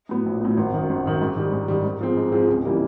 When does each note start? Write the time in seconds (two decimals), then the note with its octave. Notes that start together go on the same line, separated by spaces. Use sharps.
0.09 A2 F#3 B3
0.26 A#1
0.41 A2 F#3 B3
0.57 G#1
0.74 F#2 D#3
0.90 G#1
1.06 F#2 D#3
1.22 G#2
1.36 D#3 G3
1.52 G#2
1.68 D#3 G3
1.84 G#2
2.01 F3 G#3 C4
2.17 G#2
2.32 F3 G#3 C4
2.48 C#2
2.65 C3 E3 G3 A#3